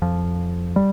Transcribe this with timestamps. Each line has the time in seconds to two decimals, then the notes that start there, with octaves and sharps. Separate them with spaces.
0.02 F2 F3
0.76 G3